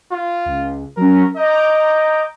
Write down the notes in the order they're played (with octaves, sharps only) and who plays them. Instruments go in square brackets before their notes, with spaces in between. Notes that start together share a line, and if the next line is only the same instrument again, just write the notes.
[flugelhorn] F4
[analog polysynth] C#2
[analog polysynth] F#3 C#4 [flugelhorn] A#4
[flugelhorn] D#5 [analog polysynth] A#5 D6 G6